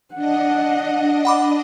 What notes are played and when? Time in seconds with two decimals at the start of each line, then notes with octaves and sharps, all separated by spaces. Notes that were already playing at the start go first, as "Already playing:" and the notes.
0.15 D4 D#5 F#5
1.25 F#5 B5 D6